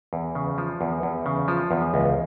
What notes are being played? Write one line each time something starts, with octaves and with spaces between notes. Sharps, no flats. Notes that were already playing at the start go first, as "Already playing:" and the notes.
E2
C#3
F3
E2
E2
C#3
F3
E2
C#2